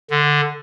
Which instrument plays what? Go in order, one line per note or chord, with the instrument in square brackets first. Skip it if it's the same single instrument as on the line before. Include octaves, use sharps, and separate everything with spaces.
[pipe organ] D3